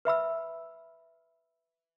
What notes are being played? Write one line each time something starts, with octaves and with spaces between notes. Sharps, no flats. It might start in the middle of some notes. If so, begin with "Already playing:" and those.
B4 E5 B5 E6